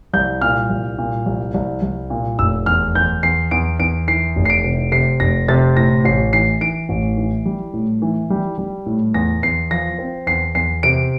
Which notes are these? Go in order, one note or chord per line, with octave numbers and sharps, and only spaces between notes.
C2 G6
A#2 F6
C2
A#2
C2
C2
C2
A#2
F1 E6
E2 F6
E2 G6
E2 C7
E2 D7
E2 D7
E3 C7
F1
C7
D7
C3
C3 C7
F1 A#6
C3 A6
A2 A#6
A1 C7
E3 C7
E3 D7
A1
E3
G3
A2
E3
G3
G3
A2
E2 A#6
E2 C7
F3 A#6
C4
E2 C7
E2 C7
C3 D7